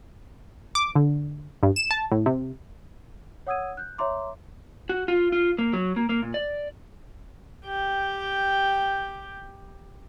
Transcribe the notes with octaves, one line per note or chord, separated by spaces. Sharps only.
D6
D3
G2
E7
A5
A2
C3
C#5 F#5 D#6 E6 G#6 D#7
F#6 G6
C#5 E5 A#5 C6 D6
F#4
F4
F4
A#3
F#3
A#3
A#3
A#2
D5
G4 G5